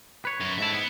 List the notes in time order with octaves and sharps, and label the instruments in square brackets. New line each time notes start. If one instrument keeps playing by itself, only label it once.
[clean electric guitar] B4 C#5
[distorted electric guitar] F#2
[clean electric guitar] G#2 E4 [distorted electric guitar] E5 A5
[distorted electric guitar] B3